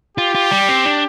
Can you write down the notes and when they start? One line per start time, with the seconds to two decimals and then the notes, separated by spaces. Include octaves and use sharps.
0.18 F4 G4
0.35 F4
0.51 G3
0.69 C4
0.86 D4